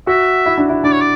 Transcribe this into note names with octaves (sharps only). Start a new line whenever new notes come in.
F#4 E5
E4
D4
E4
D4 D5
C#5
D5